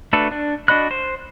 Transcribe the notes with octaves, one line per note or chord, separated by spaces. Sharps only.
A3 D4 F#4 A4 B4
D4
D4 F#4 D#5 B5 F#6
C5